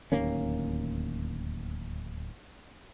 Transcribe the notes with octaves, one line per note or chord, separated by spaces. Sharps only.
D1 D#2 A#3 C#4